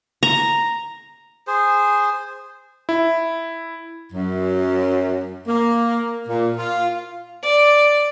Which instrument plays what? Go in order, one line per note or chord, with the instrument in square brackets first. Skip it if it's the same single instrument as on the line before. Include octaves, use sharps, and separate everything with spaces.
[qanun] A#5
[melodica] G#4 C5
[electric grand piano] E4
[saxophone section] F#2
A#3
A#2
F4
[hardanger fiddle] D5